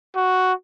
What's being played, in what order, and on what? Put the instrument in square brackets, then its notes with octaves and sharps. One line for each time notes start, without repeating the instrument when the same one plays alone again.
[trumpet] F#4